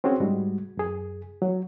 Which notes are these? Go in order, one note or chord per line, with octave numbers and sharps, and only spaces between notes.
C4 C#4 F#4 G#4 C5
G#2 G3 G#3 F#4
F#2 G#4
F#3